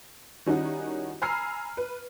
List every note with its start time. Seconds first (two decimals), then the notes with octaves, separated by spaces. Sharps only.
0.46 D#3 G3 C#4 D#4 E4 F#4
1.22 G#5 A#5 B5 E6 F6 C7
1.77 B4